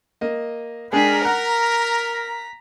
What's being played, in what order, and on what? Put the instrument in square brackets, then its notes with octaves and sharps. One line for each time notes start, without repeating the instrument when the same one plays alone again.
[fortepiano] A#3 D#5
[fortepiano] G#3 D4 G5 [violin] G#4 B6 [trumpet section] A#4
[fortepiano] F#5 [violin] A#5 B6